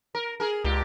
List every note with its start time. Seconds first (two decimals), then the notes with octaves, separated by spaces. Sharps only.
0.15 A#4
0.40 G#4 A#4
0.64 C#2 A#2 G4